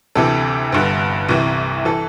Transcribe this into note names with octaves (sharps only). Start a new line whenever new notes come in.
D2 C3 E3 A4
G1 G2 D3
C2 C3 E3
E3 A4